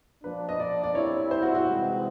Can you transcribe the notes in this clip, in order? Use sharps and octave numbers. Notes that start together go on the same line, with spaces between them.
F3 A#3 D4 B4
D#5
D5
D5
G3 C4 E4 C#5
C5
F#4
F#4
C3 E3 G#3 C4 D#4